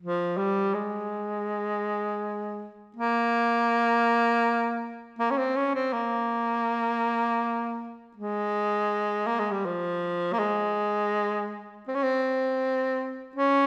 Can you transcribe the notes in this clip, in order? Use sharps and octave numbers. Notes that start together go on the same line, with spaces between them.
F3
G3
G#3
A#3
A#3
C#4
C4
C#4
C4
A#3
G#3
A#3
G#3
G3
F3
A#3
G#3
C4
C#4
C4
C#4